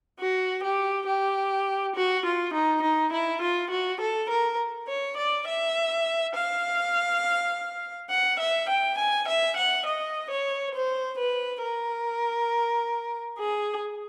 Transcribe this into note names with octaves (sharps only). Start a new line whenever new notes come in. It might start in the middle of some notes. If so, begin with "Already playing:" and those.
F#4
G4
G4
F#4
F4
D#4
D#4
E4
F4
F#4
A4
A#4
C#5
D5
E5
F5
F#5
E5
G5
G#5
E5
F#5
D#5
C#5
C5
B4
A#4
G#4